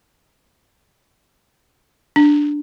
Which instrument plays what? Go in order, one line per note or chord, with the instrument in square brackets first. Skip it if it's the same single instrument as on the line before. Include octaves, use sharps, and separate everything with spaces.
[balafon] D4